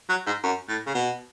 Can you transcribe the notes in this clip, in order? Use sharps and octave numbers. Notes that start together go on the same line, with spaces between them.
F#3
G#2
F#2
A2
C#3
B2